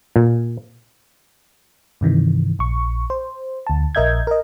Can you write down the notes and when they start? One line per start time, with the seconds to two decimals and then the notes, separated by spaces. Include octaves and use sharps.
0.16 A#2
2.01 G2 C3 D#3 E3
2.59 A#1 C#6
3.10 C5
3.67 D2 A5
3.95 A#1 A#4 D#5 E5 G6 G#6
4.27 A#4 D#5